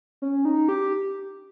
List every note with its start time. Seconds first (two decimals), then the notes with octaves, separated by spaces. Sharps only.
0.22 C#4
0.45 D#4
0.69 G4